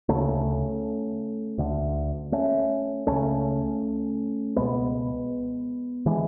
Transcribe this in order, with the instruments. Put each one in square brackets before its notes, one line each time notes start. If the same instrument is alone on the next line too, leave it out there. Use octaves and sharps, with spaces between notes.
[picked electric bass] D2 C#3 A3 C#4
D2 D3
A3 C#4
C#2 C#3 A3 C#4
C#2 B2 G#3 B3
D3 E3 G#3